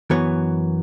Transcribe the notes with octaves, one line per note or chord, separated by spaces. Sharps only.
F#2 E3 B3 C#5